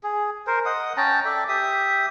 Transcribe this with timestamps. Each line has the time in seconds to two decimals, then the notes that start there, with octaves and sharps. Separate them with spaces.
0.03 G#4
0.47 A#4 C5
0.66 D#5 F#5 D#6
0.97 C#4 G5 A5 A#5
1.25 A4 D5 E5 G5
1.48 G4 E5 D#6